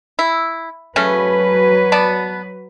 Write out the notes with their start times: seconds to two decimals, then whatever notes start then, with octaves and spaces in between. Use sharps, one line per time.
0.19 E4
0.96 C#3 F#3 A3 C#4 B4
1.92 B3 D5 A5